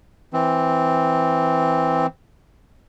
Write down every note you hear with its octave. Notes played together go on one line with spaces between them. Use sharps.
E3 C4